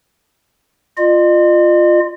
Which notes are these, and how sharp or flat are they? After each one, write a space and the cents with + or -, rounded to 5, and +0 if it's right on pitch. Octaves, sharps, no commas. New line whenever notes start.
F4 +0 D#5 -45